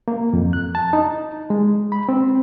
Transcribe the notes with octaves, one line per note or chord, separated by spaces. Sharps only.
A#3
F2
F#6
A5
D#4
G#3
B5
C4